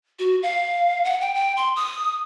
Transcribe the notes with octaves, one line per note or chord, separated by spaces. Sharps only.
F#4
F5
F#5
G5
G5
C6
D#6